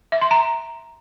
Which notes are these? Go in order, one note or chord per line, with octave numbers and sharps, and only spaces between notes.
E5
C6
A#5